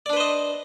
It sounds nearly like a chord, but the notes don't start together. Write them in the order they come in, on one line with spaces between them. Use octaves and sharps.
D5 D4 B4 C5 D#5